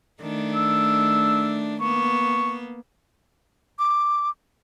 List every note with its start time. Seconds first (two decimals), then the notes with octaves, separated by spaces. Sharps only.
0.21 D#3 A3 D4
0.55 E6
1.81 A#3 B3 C#6
3.79 D6